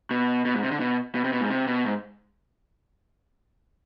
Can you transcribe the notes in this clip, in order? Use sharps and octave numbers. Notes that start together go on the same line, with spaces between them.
B2
B2
G#2
C3
D3
B2
B2
C3
B2
G#2
C3
B2
G#2